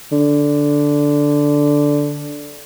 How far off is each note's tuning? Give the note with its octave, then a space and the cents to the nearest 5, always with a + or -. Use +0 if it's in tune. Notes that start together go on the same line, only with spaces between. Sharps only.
D3 -5